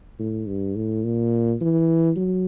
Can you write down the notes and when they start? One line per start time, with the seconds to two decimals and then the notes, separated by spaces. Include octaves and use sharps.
0.19 A2
0.48 G2
0.76 A2
1.04 A#2
1.61 E3
2.16 F#3